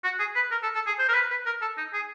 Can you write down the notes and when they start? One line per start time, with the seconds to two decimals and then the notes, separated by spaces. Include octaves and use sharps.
0.04 F#4
0.19 G#4
0.35 B4
0.51 A#4
0.63 A4
0.75 A4
0.87 G#4
0.99 C5
1.09 A#4
1.14 B4
1.30 B4
1.46 A#4
1.62 A4
1.78 D#4
1.93 G#4